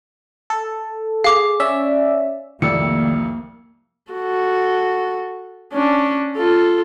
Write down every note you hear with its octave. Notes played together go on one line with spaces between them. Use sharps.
A4
G#4 F5 D6
C#4 D5 E5
C2 F2 D#3 A3 A#3 D5 E6 C#7
F#4 A4
C#4 D4
F4 A4